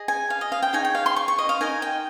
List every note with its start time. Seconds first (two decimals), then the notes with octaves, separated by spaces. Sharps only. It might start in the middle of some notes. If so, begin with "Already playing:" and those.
Already playing: G#4 D#5
0.08 G#5
0.30 F5
0.41 D#5
0.52 F5
0.62 G5
0.73 D#4 G#4 C#5 G#5
0.85 G5
0.95 F5
1.06 C6
1.16 C#6
1.28 C#6
1.38 D#5
1.49 F5
1.61 D#4 A#4 D#5 G#5
1.82 G5